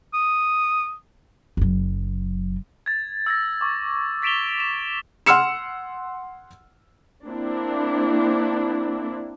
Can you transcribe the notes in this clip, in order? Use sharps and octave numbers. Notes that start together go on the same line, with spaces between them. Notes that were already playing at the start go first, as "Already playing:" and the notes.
D#6
F#1 F#3
G#6 A6
E6 G#6 A#6
C#6 D6
A6 B6 D7 E7 F7 G7
E7
F#5 C6 E6 F6 C#7 E7
A#3 C4 D4 E4